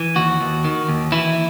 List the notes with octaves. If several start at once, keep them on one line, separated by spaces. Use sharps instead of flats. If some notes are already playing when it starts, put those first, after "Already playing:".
Already playing: E3
D#2 F#4
D#2
D#3
D#2
E3 E4